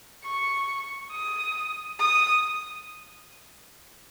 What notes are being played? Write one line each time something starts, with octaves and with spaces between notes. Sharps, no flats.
C#6
D#6
D#6